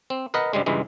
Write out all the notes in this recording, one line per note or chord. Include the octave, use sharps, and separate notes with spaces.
C4
A#4 B4 D#5 F#5
G2 C#3 G3 G#3
C#2 G2 E3 G#3